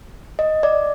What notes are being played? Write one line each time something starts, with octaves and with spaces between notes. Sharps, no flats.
D#5
D5